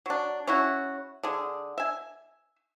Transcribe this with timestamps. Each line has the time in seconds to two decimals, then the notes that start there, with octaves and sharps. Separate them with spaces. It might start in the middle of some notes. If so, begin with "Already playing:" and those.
0.06 F#3 D4
0.47 C#4 E4 F#4
1.23 D3 G#4
1.78 E5 G#5